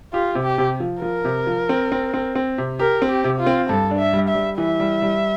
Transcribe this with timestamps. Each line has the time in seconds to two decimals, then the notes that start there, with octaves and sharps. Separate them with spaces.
0.13 F4 G4
0.35 C3
0.43 G4
0.58 C3
0.80 F3
1.02 F3 A#4
1.25 C3
1.47 F3
1.69 C4
1.92 C4
2.14 C4
2.35 C4
2.58 C3
2.79 G4 A#4
3.02 C4
3.09 G4
3.24 C3
3.40 F4
3.46 C4
3.69 G2 A4
3.91 D4
3.98 E5
4.13 G3
4.28 E5
4.35 G3
4.58 E3 E5
4.80 G3
5.02 G3